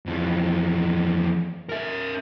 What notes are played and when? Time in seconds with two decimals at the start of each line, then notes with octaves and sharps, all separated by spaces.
0.06 F2 E3
1.69 A#4 E5